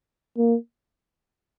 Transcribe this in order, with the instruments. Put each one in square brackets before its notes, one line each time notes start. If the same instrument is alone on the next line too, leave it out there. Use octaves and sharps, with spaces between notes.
[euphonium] A#3